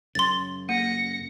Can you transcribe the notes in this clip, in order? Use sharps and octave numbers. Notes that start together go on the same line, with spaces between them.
F#2 C#3 C6 A6
A#3 A#6 C#7